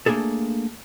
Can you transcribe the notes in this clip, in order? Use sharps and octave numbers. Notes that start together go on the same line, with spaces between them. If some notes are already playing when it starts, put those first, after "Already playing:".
A3 A#3 C4 D4 G#4 A4